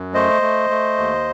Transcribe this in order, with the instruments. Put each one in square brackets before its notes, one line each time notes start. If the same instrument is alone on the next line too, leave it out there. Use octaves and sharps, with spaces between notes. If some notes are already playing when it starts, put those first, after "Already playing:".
Already playing: [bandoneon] F#2
A3 C5 D#5
A3
A3
D#2